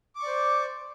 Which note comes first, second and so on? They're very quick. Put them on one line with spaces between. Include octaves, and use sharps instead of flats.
D6 C#6 D5 C5